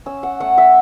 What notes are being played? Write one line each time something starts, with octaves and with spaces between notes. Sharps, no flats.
C#4 E6
F#5
A3 F#5
E5